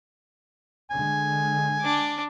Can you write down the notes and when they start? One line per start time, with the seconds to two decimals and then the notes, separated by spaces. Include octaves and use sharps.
0.91 D3 G#3 G#5
1.81 D4 D6